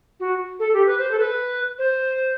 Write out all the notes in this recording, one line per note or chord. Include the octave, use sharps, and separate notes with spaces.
F#4
A4
G4
B4
C5
A4
B4
C5